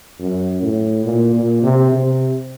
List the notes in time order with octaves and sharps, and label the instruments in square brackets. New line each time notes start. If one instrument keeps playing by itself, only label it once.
[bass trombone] F#2
A2
A#2
A#2
C3
C3